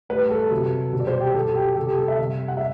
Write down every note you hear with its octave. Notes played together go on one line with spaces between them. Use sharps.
A2 G3 B4
A4
C3 F#3
B2 G3
D5
C5
G4
B2 F#3 A4
G4
C3 G3 A4
G4
A4
E5
C3 G3
F#5
E5